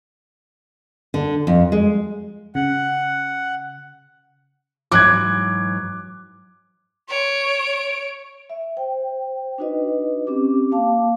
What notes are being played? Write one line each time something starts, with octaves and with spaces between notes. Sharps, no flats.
D3
F2
G#3
C#3 F#5
G#2 E3 F#3 D6 F#6 G#6
C#5 D7
E5
C5 G5
D4 D#4 F#4 B4 D#5
C4 C#4 G4 D6
A#3 F5 A5 D6